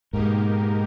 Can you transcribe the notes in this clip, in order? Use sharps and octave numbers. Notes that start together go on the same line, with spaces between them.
G#2 B2 A#3 D#4 G4 A#4